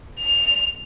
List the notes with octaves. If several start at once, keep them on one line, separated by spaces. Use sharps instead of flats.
F7